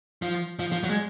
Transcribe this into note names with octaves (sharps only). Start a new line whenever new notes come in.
F3
F3
F3
F#3
G#3